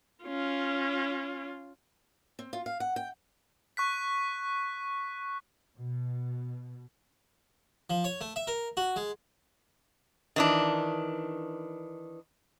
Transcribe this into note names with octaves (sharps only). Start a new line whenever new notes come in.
C#4 F4
C4
F4
F5
F#5
G5
C#6 F#6 B6
B2
F3
C#5
A3
E5
A#4
F#4
G#3
D#3 E3 D4